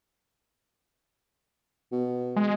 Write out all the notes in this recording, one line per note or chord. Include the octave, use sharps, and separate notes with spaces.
B2
G#3